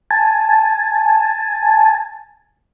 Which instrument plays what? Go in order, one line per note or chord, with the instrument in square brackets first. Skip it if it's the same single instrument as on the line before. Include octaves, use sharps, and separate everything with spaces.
[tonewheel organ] G#5 A5